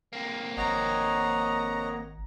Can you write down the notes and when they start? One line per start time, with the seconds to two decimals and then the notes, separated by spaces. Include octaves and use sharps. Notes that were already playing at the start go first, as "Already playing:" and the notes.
0.13 A#3 C4
0.57 G#1 C#5 D#5 F#5 A#5